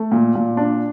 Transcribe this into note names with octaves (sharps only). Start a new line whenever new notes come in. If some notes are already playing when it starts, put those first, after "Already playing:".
Already playing: A3
A#2
A#2
D4